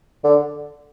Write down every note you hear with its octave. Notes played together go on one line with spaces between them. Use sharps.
D3